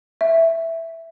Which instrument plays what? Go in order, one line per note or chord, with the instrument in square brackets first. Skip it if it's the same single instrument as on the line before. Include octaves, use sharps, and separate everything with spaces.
[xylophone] E5